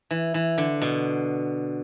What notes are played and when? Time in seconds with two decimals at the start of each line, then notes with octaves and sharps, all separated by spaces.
0.11 E3
0.34 E3
0.58 D3
0.82 B2